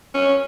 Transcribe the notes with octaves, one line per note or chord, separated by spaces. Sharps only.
C#4